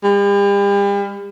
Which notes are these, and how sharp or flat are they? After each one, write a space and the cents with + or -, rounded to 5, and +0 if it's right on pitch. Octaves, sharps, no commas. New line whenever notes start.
G3 +40